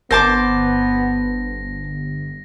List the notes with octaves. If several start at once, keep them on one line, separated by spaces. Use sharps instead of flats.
G1 B3 C5 A5 D6 A#6